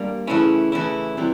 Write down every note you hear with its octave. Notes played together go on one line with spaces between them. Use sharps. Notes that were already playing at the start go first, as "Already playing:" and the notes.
Already playing: G3 A#3 D4
C#3 E3 A3 C#4 E4
C#3 E3 A3 C#4 E4
C3 E3 G3